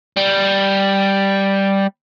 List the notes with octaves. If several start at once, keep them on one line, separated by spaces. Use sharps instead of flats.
G3